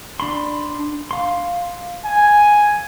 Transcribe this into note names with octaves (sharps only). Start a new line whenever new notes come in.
D4 B5 C6
F5 C6
G#5